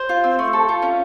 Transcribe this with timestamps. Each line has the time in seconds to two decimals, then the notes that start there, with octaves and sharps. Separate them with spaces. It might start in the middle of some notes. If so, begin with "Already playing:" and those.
Already playing: C5
0.09 F4
0.24 C4
0.39 A3
0.53 A4
0.69 F4
0.82 C#4